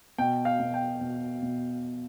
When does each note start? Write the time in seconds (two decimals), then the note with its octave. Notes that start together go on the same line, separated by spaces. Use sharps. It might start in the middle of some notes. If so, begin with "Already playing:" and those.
0.18 B2 G5
0.45 F5
0.60 B2
0.74 G5
1.01 B2
1.42 B2